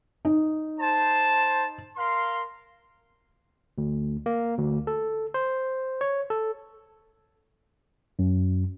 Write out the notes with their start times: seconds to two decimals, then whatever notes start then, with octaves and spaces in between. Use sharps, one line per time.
0.25 D#4
0.79 C5 A5
1.97 A#4 F5 C6
3.78 D2
4.26 A#3
4.58 D2
4.87 A4
5.34 C5
6.01 C#5
6.30 A4
8.19 F#2